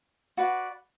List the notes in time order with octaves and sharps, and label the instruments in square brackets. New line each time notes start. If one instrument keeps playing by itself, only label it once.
[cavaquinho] F#4 B4 D5